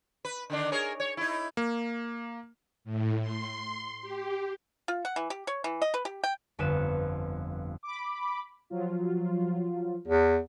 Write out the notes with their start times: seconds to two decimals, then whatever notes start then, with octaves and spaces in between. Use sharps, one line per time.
0.25 B4
0.50 D3 D#3 D4
0.72 G#4 A#4 C#5
1.00 C#5
1.17 D#4 E4
1.57 A#3
2.84 A2
3.21 C6
4.01 G4
4.88 F4
5.05 F#5
5.16 E3
5.30 G4
5.47 C#5
5.64 E3
5.82 D#5
5.94 B4
6.05 G4
6.24 G5
6.59 G1 F2 B4 C#7 E7
7.83 B5 D6
8.70 F3 F#3 F4
10.08 E2